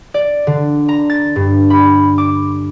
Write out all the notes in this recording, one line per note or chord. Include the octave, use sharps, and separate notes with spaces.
D5
D3
A#5
A6
G2
B5
D6